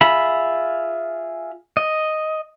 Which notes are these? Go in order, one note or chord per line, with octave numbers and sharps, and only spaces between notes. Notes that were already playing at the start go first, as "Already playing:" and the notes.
F4 G#4 E5 B5
D#5